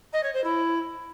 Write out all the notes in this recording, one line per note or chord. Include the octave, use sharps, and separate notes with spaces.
D#5
C#5
C5
E4